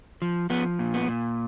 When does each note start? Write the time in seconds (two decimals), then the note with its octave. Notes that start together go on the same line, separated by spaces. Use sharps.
0.22 F3
0.50 F3 B3
0.79 A#2
0.94 B3
1.08 A#2